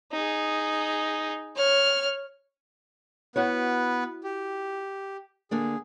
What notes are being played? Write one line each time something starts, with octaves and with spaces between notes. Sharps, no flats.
D#4 G#4
C#5 F6
B3 E4 F#4 B4 C#5
G4
D3 A#3 D4 G#4